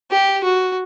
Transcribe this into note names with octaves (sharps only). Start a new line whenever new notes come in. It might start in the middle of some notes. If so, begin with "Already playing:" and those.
G4
F#4